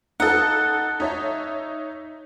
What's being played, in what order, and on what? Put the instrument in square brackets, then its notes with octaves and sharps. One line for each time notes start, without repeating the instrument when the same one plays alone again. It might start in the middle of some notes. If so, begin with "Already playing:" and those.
[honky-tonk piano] D#4 A4 [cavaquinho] F#5
[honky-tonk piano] D#4 C#5 E5